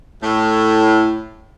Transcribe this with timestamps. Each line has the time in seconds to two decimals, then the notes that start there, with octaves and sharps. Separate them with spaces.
0.22 A2